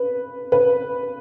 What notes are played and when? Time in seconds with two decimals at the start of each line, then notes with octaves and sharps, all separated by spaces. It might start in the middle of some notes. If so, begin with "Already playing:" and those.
Already playing: B4
0.52 B4